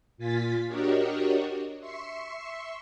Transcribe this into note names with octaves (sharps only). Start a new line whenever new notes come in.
A#2 F4 G#5 A6 B6
D4 F#4 G4 A#4 C#5 D#5
E5 C6 C#6